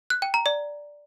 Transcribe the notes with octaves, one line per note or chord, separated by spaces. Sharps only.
F#6
G5
A#5
D5